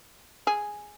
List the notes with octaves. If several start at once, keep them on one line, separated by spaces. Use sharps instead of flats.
G#4